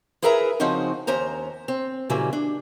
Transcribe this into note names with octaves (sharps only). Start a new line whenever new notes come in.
E4 G#4 A#4 B4 E5 A#5
C#3 F3 C4 C#4 D#4 F#4
D#2 C#4 C5 A#5
C4
A#2 C#3 E3 F#3 G3 A#3
D4